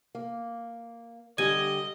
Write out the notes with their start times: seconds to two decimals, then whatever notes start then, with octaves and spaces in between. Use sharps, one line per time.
0.15 A#3
1.38 D3 G3 G4 D#5 G#5